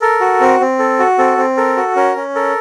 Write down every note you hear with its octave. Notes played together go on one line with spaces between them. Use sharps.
A4 A#4
F#4
C4
C4
A4
F#4
C4 A4
C4
A4 A#4
F#4
C#4 A#4
C#4
A4 A#4